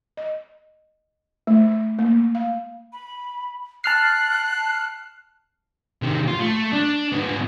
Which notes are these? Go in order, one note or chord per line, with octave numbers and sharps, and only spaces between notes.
D#5
A3
A#3
F5
B5
A5 F6 F#6 C7
C3 D#3
F4
A3
D4
G#2 B3